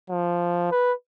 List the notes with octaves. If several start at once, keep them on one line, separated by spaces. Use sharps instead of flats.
F3
B4